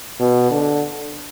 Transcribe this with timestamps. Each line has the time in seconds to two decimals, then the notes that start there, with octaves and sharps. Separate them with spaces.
0.19 B2
0.51 D3